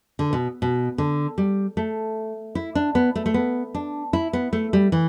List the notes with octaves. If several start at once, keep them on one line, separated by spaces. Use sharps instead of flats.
D3
B2
B2
D3
G3
A3
E4
D4
B3
A3
A3
B3
D4
E4
B3
A3
G3
E3